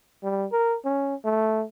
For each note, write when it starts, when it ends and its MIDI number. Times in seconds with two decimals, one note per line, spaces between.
0.23 0.46 55
0.52 0.76 70
0.85 1.15 61
1.25 1.64 57